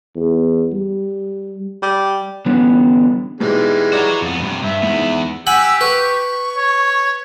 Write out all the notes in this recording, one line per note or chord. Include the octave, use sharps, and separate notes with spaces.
E2
G3
G3
D3 E3 F#3 G3 B3 C#4
G#2 B2 E3 G3 G#3
F#4 C#5 D5 A#5
F2 B3
G2 C3
G2 E5
E2 G#2 B3
G4 F#5 G#5 B5 E6
B4 C#6
C#5